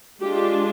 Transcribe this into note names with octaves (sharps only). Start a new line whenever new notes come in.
G#3 D4 F4 G4